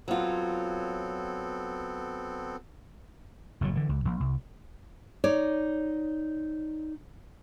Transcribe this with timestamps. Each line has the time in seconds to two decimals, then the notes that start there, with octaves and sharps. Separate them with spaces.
0.08 F#3 B3 C4 F4 A4
3.61 F#1 A2 C#3 F#3
3.75 D3 E3
3.89 C#2
4.05 A#1
4.20 C2
5.24 D#4 C#5 D5